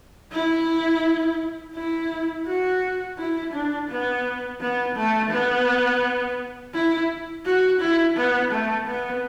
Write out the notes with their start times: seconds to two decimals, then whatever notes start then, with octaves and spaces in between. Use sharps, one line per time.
0.33 E4
1.75 E4
2.46 F#4
3.18 E4
3.53 D4
3.89 B3
4.61 B3
4.96 A3
5.31 B3
6.74 E4
7.46 F#4
7.80 E4
8.17 B3
8.52 A3
8.87 B3